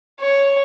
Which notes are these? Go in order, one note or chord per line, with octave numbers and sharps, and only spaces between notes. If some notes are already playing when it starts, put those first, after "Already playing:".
C#5